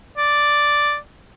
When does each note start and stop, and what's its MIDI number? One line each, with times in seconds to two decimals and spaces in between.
0.18 0.96 74